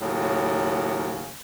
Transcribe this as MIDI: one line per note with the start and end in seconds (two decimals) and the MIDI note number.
0.01 1.31 39
0.01 1.31 45
0.01 1.31 49
0.01 1.31 54